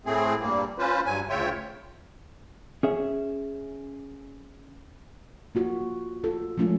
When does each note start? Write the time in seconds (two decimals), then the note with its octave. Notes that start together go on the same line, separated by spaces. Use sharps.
0.06 A2 A3 C4 G#4
0.40 G2 A#2 G3 A#3
0.79 C#4 F4 B4 C5
1.05 G2 F#3 G#5
1.29 D2 C#3 F4 C#5 E5 G5
2.83 C#4 G#4 E5
5.55 A#3 F4 F#4
5.81 A#3
6.24 F4 A4
6.57 F3 G#3 A3 C#4 F4